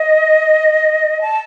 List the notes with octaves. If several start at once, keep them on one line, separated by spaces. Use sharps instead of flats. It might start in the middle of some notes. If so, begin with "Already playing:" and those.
Already playing: D#5
A5